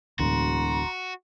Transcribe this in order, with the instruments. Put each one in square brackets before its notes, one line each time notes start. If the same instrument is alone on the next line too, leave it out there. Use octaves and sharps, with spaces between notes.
[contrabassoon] E1 [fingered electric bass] D2 A2 [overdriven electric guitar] F#4 [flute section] A#5 C6